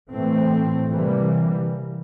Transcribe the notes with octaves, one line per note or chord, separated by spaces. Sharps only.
A2 E3 A3 C4
C3 E3 G3 A#3